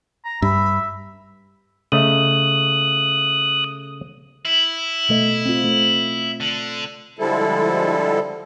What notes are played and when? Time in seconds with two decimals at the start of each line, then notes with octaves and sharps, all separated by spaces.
0.25 A#5
0.42 G2 E5 B5
1.92 C#3 A3 D#5 D#6 F#6
4.45 E4
5.09 B2 A3 D#5
5.46 C4 F4
5.64 A3
6.40 D3
7.19 D3 F3 G3 G#3 E4 A4